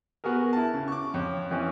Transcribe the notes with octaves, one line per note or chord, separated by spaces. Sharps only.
B3 F#4 G#4 A#4
E4 A5
C#3
C#6 D6
F2 C#5
F2 E3 C#4